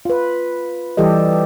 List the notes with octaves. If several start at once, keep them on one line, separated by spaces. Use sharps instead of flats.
F4 B4
E3 G3 G4 A4 D#5